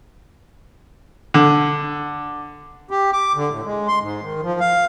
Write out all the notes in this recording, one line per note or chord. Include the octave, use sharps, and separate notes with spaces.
D3
G4
D6
D3
A2
G#3
C6
G#2
D#3
F3
F5